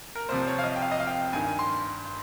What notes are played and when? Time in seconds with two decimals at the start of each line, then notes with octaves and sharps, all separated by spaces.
0.15 A#4
0.29 C2 C3 F3 C5
0.47 C#5
0.59 F5
0.64 D#5
0.76 G5
0.82 F5
0.92 D#5
1.00 F5
1.07 G5
1.33 G2 D#3 G#5
1.59 C6